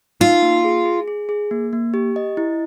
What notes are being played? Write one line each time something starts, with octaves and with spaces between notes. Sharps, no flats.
D#4 F4
A#3
G#4
G#4
G#4
G#4
A#3
A#3
G4
D#5
E4